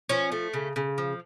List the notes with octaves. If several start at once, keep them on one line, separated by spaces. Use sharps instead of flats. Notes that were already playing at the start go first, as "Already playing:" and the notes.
F3 C#4
A3
C#3
C#3
F3